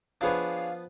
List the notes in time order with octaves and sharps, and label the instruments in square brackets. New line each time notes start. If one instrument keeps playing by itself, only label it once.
[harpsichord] F3 B3 B4 [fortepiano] D4 G#4 C#5 [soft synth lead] F5